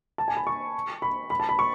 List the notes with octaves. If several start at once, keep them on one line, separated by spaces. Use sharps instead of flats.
A5
G#5
B5
C#6
B5
B5
A5
B5
C#6